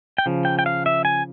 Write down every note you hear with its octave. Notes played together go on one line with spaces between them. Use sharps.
G5
C#3 F3
G5
G5
F5
E5
G#5